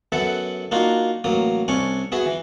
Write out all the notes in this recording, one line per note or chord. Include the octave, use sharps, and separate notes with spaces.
F#2 B3 A4 E5 F#5
A#3 D4 D#4 F4 F#4
A1 F#3 A#3 D#6
C2 C#4 D4 G#5 C#6
B3 F#4 G#4 E5
E3